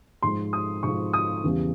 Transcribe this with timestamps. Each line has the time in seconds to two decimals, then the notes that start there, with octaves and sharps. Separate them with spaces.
0.22 G#2 F3 G#3 C6
0.53 D#6
0.83 G#2 F3 G#3 C#6
1.13 D#6
1.44 E2 C#3 E3 G3